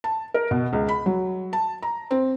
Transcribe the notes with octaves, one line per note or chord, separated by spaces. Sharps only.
A5
A#4
B2
C#2
B5
F#3
A5
A#5
C4